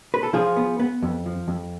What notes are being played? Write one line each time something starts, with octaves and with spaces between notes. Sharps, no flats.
B4
A4
F3 F4 G#4
B3
B3
F2
F3
F2